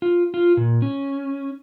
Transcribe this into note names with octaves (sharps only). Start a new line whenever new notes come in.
F4
F4
A#2
C#4